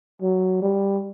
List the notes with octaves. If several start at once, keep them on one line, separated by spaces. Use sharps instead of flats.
F#3
G3